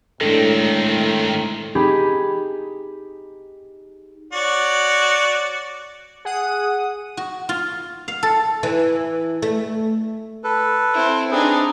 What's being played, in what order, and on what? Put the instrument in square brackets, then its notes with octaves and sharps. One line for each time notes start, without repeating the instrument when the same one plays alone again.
[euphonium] A2 [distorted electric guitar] D#3 C4 [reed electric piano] G#3 D4 A4
[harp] D#4 G4 G#4 B5
[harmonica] F#4 C#5 D5
[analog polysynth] G#4 F#5 D#6
[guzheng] F#4
F4
F5
A4
[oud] E3
A3
[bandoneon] A4 B4
[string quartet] C4 E4
[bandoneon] C4 G#4 B4 [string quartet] D4 D#4